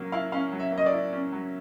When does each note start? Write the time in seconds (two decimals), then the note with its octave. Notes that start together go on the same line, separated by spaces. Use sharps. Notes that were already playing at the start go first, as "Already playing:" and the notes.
Already playing: F#3 A#3 C#4
0.12 E4 F5
0.32 C#4 F5
0.52 F#3
0.59 E5
0.72 A#3
0.78 D#5
0.86 D5
0.93 E4
1.13 C#4
1.32 F#3